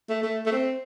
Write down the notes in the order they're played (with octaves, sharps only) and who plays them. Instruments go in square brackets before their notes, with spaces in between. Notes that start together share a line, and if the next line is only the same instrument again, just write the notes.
[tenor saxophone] A3
A3
A3
C4